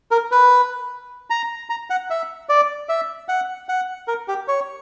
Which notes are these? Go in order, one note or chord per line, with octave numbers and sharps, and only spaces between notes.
A#4
B4
A#5
A#5
F#5
E5
D5
E5
F#5
F#5
A#4
G4
C#5